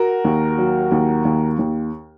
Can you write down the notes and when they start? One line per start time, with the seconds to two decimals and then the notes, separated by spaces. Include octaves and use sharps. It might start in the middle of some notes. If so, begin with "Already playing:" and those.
Already playing: F#4 A#4
0.24 D#2
0.58 F#3
0.91 D#2
1.25 D#2
1.59 D#2